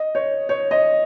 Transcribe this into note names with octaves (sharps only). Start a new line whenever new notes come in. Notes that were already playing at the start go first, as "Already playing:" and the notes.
Already playing: D#5
C#5
C#5
D#5